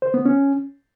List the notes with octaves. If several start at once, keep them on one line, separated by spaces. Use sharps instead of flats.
C5
B3
C#4